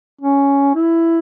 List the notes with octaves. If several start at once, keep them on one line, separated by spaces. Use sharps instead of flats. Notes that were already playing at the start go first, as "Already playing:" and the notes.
C#4
E4